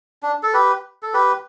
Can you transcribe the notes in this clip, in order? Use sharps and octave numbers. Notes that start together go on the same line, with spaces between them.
D4
A4
G4 B4
A4
G4 B4